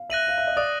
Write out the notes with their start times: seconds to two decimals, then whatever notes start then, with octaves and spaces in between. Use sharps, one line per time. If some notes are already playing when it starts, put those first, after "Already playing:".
Already playing: F5
0.10 E5 F#6 A#6 D#7 F#7
0.28 F5
0.38 E5
0.47 D#5
0.57 D5 D#6